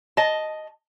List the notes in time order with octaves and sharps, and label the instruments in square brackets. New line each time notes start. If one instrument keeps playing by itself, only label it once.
[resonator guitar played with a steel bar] D#5 A5